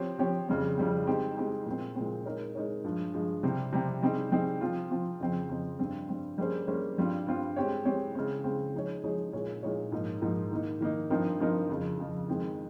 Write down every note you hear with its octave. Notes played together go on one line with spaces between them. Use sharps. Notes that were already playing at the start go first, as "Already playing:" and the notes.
Already playing: F3 C4 G4 C#5
F3 C4 G4 C#5
F2 C#3 G3 C4
F2 C#3 G3 C4
G#3 C4 D#4 G4
G#3 C4 D#4 G4
A#2 G#3 C4
A#2 G#3 C4
G#3 D#4 A#4 C#5
G#3 D#4 A#4 C#5
G2 F3 G#3
G2 F3 G#3
C3 G3 C4
C3 G3 C4
G3 C4 D#4 G#4
G3 C4 D#4 G#4
F3 C4 F4
F3 C4 F4
F2 C#3 F3 C4
F2 C#3 F3 C4
G2 G3 C4
G2 G3 C4
G3 A#3 C#4 G#4 C5
G3 A#3 C#4 G#4 C5
G2 G3 C4 F4
G2 G3 C4 F4
G#3 C4 G4 C#5
G#3 C4 G4 C#5
C#3 G#3 C4
C#3 G#3 C4
F3 G#3 D#4 G#4 C#5
F3 G#3 D#4 G#4 C#5
A#2 G#3 D#4 G#4 C#5
A#2 G#3 D#4 G#4 C#5
G#2 F3 A#3 D#4
G#2 F3 A#3 D#4
D#3 A#3 D#4
D#3 A#3 D#4
G2 F3 C4 D#4 A#4
G2 F3 C4 D#4 A#4
F2 C#3 F3
F2 C#3 F3
F2 D#3 G#3 C4